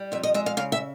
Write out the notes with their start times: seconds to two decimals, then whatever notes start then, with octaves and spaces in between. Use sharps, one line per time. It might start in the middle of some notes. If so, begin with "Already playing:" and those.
Already playing: G3
0.12 F2 E5
0.23 D#5
0.34 G#3 E5
0.46 F5
0.57 C#3 F5
0.72 E5